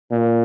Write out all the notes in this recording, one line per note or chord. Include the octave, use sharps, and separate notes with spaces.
A#2